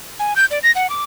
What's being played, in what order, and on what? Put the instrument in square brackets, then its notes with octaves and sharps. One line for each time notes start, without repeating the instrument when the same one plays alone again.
[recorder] G#5
G6
D5
A#6
F#5
D6